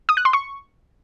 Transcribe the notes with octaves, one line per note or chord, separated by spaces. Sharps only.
D#6
F#6
C6
C#6